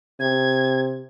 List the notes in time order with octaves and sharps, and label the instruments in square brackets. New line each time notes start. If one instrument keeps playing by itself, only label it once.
[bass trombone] C3 [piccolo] G#6